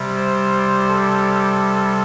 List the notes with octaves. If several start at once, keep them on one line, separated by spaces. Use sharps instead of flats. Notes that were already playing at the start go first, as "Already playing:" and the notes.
Already playing: C3 G3
C5
A4